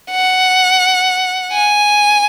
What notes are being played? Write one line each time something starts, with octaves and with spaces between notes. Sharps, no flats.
F#5
G#5